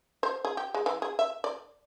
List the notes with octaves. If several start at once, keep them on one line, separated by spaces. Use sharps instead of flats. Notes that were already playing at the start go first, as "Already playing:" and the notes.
C5
G#4
G4
G#3
E3
G#4
E5
D5